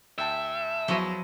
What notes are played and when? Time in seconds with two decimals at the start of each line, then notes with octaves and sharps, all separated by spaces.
0.18 D2 E5 G5 A5
0.88 E2 F3 F#3 E4 D#5 C#6 D#7